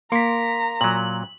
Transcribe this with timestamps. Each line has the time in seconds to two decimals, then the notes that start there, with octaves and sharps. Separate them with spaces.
0.12 A#3 A#5 C6 B6
0.81 A#2 F#3 F#7